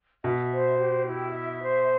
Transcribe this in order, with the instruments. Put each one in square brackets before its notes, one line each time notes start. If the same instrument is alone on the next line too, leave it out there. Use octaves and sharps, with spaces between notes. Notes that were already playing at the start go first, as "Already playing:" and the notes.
[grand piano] B2 [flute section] E5
[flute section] C5
G4
E4
E5
C5